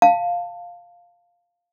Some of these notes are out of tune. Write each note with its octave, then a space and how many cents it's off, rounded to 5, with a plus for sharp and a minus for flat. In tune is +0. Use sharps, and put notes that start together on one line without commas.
F5 +0 A5 +15